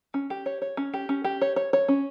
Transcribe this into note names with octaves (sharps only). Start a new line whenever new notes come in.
C#4
G4
C#5
C#5
C#4
G4
C#4
G4
C#5
C#5
C#5
C#4